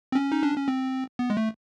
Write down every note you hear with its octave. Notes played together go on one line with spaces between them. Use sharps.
C4
C#4
D#4
D4
C#4
C4
B3
G#3
A3